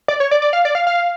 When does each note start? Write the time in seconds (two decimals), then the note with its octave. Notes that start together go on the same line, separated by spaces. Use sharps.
0.08 D5
0.20 C#5
0.31 D5
0.42 D5
0.53 F5
0.65 D5
0.75 F5
0.87 F5